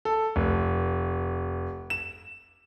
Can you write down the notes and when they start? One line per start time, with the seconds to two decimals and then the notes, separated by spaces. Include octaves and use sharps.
0.05 A4
0.36 F1
1.90 E7